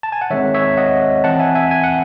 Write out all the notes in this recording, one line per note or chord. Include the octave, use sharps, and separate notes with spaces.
A5
G#5
F#5
D#3 G#3 C4 C#5 E5
C#5 E5
D#5 F#5
E3 C4 F#5 A5
E5 G#5
E5 G#5
G#5
F#5